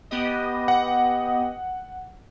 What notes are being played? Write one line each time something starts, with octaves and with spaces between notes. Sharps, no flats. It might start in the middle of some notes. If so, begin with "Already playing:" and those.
B3 G4 D#5
F#5